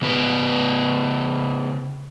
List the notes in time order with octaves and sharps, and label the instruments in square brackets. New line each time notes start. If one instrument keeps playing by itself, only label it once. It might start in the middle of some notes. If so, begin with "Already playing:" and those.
[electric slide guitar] C#3 B3 B4